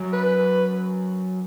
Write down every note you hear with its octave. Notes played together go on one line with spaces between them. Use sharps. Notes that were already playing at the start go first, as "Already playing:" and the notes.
Already playing: F#2
B4